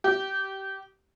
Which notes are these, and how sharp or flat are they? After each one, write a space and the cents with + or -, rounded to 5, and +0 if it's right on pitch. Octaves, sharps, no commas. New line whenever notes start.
G4 -20